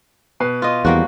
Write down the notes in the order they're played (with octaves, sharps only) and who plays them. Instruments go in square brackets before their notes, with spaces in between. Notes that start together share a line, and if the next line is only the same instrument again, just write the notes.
[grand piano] B2 B4 C7
[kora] F4 D#5
[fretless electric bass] E2 [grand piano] F3 [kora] G3 A#3 F#4